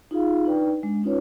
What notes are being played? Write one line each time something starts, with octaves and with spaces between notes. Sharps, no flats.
D#4 F4 G#4 F5
D4 D#4 B4 D5 G5
G#3 D4
C#4 D#4 F4 B4 C#5